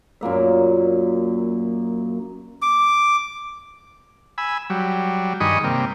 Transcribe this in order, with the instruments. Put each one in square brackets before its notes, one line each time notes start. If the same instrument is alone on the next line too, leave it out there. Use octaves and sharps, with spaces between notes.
[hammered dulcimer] F#2 A#2 A#3 E5
[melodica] D6
[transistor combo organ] G#5 B5 E6
F#3 G3
G2 D#3 G#4 D#5 B5 C#6
C3 G3 A#3